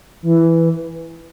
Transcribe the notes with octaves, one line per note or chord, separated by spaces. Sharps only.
E3